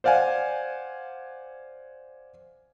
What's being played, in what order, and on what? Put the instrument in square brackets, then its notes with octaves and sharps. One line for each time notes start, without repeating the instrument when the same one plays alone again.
[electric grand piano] C5 D5 F5 F#5 G#5